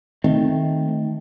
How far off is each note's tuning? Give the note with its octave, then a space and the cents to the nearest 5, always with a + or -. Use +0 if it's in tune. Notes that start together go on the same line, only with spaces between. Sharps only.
D#3 +0 A3 +0 C4 +0